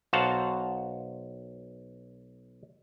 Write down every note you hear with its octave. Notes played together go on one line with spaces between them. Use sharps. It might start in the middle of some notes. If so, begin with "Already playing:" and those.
B1 F#4 C5 F5 F#5 A5